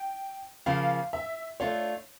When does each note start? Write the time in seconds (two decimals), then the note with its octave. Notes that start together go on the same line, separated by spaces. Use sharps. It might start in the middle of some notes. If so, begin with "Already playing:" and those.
Already playing: G5
0.66 C#3 F3 A#3 F5
1.13 E5
1.60 A3 D4 F4 C#5